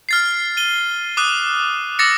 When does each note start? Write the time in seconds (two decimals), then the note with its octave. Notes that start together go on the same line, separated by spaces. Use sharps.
0.09 F6 A6 C7
0.57 D#7 G7
1.17 D6 D#6 F#6 D#7
1.99 D6 E6 A6 A#6 C#7